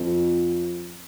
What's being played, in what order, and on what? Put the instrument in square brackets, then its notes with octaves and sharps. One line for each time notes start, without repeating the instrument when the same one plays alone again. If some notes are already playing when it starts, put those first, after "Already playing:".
Already playing: [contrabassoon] F2